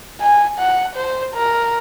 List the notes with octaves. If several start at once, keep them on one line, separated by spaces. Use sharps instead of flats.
G#5
F#5
C5
A#4